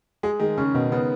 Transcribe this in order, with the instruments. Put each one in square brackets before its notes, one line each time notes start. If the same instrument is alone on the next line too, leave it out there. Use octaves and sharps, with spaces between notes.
[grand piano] G#3 [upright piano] G#4
[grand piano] D#3 [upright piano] G#3
[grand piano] C#3 [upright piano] C#4
[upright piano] B2 [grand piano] D#3
[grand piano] C#3 [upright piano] B3